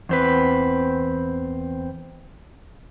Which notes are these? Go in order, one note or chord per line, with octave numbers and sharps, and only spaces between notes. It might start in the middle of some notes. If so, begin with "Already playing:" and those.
E2 C4 B4